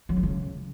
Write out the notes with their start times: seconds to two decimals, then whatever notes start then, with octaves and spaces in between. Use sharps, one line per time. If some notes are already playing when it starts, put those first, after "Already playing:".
0.09 F#3
0.16 D#3
0.23 C#3